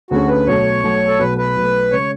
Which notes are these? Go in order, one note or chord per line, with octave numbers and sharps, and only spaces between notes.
D2 D3 A3 C#4 F#4 G#4
B4
B1 B2 A3 C#5
B1 B2 A3
A4
B1 B2 A3 B4
B4
B1 B2 A3
C#3 G#3 C#4 C#5